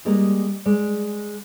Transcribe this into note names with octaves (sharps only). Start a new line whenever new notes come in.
G3 G#3 A#3 A#4 D#5
G#3 D5